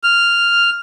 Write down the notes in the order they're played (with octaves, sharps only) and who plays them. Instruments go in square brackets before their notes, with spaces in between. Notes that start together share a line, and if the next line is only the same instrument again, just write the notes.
[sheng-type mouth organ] F6